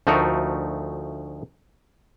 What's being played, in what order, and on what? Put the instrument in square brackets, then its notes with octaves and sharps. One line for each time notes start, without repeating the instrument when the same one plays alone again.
[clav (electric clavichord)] D2 F3 A3 D#4 F#4 A#4